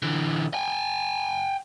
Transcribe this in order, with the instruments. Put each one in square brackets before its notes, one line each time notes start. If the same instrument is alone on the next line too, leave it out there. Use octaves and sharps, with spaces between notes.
[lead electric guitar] D3 E3
G5 G#5